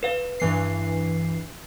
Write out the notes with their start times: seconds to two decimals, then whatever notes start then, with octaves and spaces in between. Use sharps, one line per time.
0.03 B4 F5
0.40 G2 E3 C7